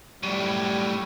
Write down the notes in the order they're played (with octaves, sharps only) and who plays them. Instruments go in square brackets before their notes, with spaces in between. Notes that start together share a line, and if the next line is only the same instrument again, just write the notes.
[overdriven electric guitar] F#2 A2 [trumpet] G3